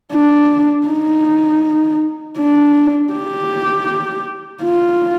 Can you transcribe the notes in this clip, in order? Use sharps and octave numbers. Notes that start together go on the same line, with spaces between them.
D4
D#4
D4
G4
F4